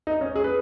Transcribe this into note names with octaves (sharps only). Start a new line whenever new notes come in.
D#4
C#4
G#4
B4